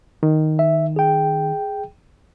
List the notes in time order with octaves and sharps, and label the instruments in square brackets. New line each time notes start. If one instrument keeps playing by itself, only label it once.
[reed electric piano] D#3
[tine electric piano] E5
G#4 G5